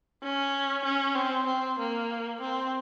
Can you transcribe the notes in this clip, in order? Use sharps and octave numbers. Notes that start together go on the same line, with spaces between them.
C#4
C#4
C4
C4
A#3
C4